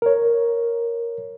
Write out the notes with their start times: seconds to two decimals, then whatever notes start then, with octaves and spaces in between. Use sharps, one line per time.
0.02 A#4 C#5